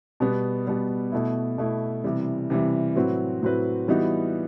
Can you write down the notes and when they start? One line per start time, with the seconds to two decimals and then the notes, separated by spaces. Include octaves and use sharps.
0.20 B2 G3 B3
0.67 B2 G3 B3
1.12 B2 A3 E4
1.58 B2 A3 E4
2.04 C3 E3 G3
2.50 C3 E3 G3
2.96 A2 F#3 C4 F#4 B4
3.42 A2 F#3 C4 F#4 B4
3.88 E3 G3 B3 D#4 F#4